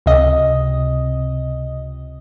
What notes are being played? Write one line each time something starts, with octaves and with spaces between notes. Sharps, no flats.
C#2 C3 D#5